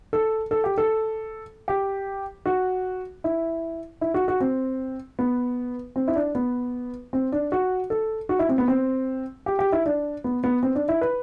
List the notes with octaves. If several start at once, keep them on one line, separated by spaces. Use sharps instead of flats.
A4
A4
G4
A4
G4
F#4
E4
E4
F#4
F#4
C4
B3
C4
E4
D4
B3
C4
D4
F#4
A4
F#4
E4
C4
B3
C4
G4
G4
E4
D4
B3
B3
C4
D4
E4
B4